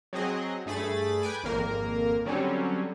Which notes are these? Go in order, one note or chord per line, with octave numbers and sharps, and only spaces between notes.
F#3 C4 G#4 D#5
G2 A3 G#4 B5 A6
B4 G5 G#5 D6
G#1 F2 A#3 A#4
D3 F#3 G3 C4 C#4